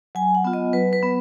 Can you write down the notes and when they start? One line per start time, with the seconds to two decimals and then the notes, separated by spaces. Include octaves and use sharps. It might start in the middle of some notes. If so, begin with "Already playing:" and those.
0.15 F#3 G#5
0.35 F#5
0.44 B3 F4
0.53 D#5
0.73 F#3 B4
0.93 B4
1.02 B3